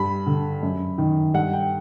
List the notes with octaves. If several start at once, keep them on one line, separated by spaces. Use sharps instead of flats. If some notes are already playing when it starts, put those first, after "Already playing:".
Already playing: G2 B5
D3
F#2
D#3
G2 F#5
G5